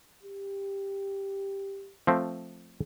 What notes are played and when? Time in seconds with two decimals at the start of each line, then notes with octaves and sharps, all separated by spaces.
0.23 G4
2.07 F3 A3 C4